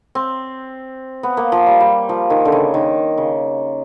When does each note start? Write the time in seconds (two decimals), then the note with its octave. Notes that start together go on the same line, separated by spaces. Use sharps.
0.15 C4
1.23 B3
1.37 A#3
1.52 F3
1.67 G3
1.80 G3
2.09 F3
2.30 D#3
2.45 D3
2.52 C#3
2.74 D#3
3.18 C#3